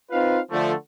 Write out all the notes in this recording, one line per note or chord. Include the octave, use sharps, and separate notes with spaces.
C4 D#4 F4 B4 F5
D3 F3 A3